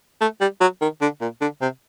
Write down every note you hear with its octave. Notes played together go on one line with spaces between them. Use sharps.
A3
G3
F#3
D#3
D3
A#2
D3
C3